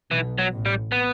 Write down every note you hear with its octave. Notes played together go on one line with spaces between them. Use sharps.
B1 B2 E3
F#3
A1 A2
G3
B3